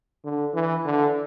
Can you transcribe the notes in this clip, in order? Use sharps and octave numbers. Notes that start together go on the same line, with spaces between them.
D3
E3
D3